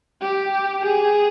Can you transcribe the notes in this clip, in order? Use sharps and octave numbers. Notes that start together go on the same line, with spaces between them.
G4
G#4